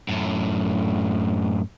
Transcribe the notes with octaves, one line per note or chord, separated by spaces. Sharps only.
F#2 A2